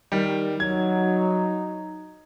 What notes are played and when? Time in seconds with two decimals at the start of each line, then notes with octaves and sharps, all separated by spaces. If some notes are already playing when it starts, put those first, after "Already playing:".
0.12 D#3 G3
0.60 F#3 D#4 G#6